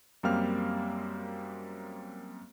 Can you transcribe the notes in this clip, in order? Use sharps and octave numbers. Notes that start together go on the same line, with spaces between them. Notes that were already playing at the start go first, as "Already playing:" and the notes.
F#2 G3 A#3 C4 F5 F6